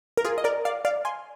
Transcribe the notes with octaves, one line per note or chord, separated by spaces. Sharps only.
A#4
F4 G#4
D#5
A#4 D5
D5 F5
D5 F5
G#5 C6